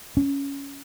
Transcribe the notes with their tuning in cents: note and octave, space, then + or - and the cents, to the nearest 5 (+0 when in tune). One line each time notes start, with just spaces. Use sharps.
C#4 +10